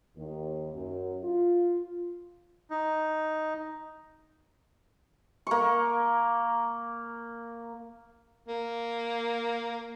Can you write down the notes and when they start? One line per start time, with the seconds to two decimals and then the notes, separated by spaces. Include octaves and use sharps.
0.16 D#2
0.73 F#2
1.23 F4
2.70 D#4
5.47 A#3 C#6
8.48 A#3